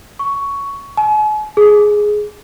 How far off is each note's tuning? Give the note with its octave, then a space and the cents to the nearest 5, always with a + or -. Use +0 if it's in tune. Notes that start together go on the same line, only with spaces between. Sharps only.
C#6 +10
G#5 +45
G#4 +5